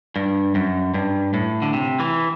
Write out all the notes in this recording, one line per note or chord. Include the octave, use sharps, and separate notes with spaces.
G2
F#2
G2
A2
D3
C3
E3